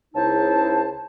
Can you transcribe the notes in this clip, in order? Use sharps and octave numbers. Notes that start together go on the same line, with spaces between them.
C#2 C#3 D#4 E4 C5 A5